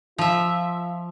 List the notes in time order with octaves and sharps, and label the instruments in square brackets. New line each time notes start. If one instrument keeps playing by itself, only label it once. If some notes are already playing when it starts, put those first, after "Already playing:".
[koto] F3 E5 [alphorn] F4